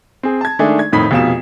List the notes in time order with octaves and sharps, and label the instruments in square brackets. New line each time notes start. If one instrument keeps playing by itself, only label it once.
[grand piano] C4 G#4
A5 G#6
D#3 G#3 A3 D4 G#4
G#6
F2 A2 D#3 D#4 B5 B6
F1 B2 F4 E7